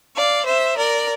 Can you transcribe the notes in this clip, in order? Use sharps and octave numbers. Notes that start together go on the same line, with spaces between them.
D5 F5
C5 E5
A#4 D5